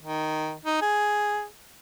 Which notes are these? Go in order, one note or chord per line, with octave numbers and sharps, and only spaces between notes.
D#3
D#4
G#4